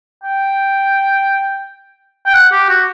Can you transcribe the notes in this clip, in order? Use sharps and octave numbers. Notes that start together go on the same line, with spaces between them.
G5
G5
F#5
G4
F#4